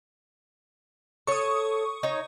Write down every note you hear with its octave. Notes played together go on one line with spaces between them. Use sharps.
A4 C#5 C#6 D#6
D#4 C#5